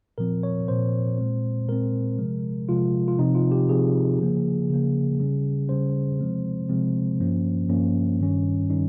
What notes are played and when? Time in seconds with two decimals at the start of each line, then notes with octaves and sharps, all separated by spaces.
0.18 A#2 F3 C4 A#4
0.43 C#5
0.68 A#2 F3 C4 C5
1.18 A#2 G#3 C4
1.68 A#2 G#3 C4 A#4
2.18 C3 F3 G#3
2.69 C3 F3 G#3 F4
3.08 F4
3.18 C3 F3 C4 D#4
3.35 F4
3.52 G4
3.68 C3 F3 C4 G#4
4.19 C#3 F3 A#3
4.70 C#3 F3 A#3
5.19 C#3 G3 C#4
5.69 C#3 G3 C#4 C5
6.19 C3 F3 G#3 C4
6.69 C3 F3 G#3 C4
7.20 G2 F3 A#3 C#4
7.69 G2 F3 A#3 C#4
8.20 G2 D#3 G3 C#4
8.70 D#3 G3 C#4 D#4